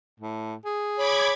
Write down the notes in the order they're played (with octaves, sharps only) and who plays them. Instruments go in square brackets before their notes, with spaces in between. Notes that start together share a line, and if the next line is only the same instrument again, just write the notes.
[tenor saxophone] A2
G#4
[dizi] C#5 [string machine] B5 D6 G#6